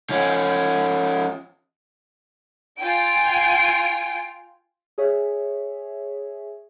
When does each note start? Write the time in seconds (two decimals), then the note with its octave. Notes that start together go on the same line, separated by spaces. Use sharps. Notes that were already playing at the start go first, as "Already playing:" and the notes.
0.10 F3 C#4
2.81 F4 G5 G#5 D7
4.98 G#4 C#5 E5